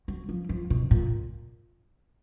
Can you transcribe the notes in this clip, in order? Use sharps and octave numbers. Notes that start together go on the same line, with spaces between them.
F#3
F3
F3
B2
A#2